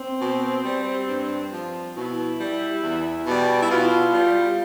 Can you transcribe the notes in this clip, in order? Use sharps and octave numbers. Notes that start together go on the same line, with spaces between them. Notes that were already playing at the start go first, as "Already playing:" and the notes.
Already playing: C4
B2
G3
G2
F3
B2 E4
G3
E2
B2
G3
E4
B2 F4
G3